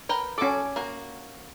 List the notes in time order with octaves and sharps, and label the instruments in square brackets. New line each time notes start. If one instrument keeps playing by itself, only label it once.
[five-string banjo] A#4 B4 G5
[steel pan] C#4 D6 [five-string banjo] F#4 A4
[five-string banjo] A#3 F#4